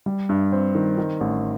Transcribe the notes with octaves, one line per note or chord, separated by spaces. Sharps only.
G3
G2
C4
D#3
D#3
A1